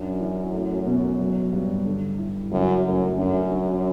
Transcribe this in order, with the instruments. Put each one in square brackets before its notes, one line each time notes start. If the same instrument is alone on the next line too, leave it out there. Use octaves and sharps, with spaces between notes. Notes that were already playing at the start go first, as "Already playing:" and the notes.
Already playing: [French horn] F#2 [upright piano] D4
[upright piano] E3
A3
B2
F#3
G2
D3
E4
[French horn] F#2 [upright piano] C#3
[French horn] F#2 [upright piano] A3
[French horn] F#2 [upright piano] D4
[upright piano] D4